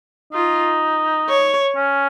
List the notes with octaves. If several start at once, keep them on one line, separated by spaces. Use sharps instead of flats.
D#4 F4
C#5
C#4